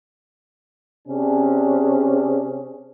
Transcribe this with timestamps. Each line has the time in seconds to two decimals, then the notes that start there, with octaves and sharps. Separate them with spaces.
1.07 C3 C#4 D4 G#4